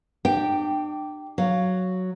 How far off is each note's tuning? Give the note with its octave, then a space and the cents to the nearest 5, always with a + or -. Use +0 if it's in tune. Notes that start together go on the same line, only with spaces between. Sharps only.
D4 +40 G4 -10 G5 +0
F#3 +0 F5 +0